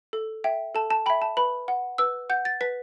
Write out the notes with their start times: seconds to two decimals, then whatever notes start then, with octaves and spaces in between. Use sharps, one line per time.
0.13 A4
0.44 E5 G5
0.75 A4 A5
0.90 A5
1.06 E5 G5 B5
1.22 A5
1.37 B4 B5
1.68 F#5
1.98 B4 E6
2.30 F#5 G6
2.45 A6
2.61 B4 B6